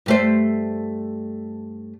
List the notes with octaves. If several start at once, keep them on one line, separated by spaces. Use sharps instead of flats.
G2 A3 C5